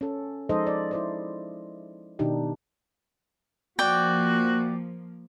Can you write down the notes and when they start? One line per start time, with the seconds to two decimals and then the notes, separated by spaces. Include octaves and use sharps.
0.01 C#4 A4
0.49 F3 G#3 D#4 A4 C5 D#5
0.66 D5
0.91 E4 C5 D5
2.19 B2 D#3 D4 D#4 G4
3.79 F3 A#3 F#4 D5 G5